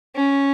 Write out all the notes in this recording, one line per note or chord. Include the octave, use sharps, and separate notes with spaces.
C#4